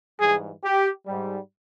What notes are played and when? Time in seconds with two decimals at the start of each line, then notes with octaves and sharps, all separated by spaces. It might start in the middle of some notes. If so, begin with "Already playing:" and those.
0.20 G#2 E3 G3 G#4
0.63 G4
1.07 G#2 G3